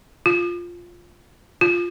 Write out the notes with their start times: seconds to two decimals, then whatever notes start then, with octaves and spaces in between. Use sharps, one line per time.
0.26 F4
1.61 F4